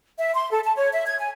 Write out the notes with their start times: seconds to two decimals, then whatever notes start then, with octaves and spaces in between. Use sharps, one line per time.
0.18 E5
0.34 C6
0.51 A4
0.64 A5
0.76 C#5
0.93 E5
1.06 G#6
1.19 G#5